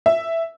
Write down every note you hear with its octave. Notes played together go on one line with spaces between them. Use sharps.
E5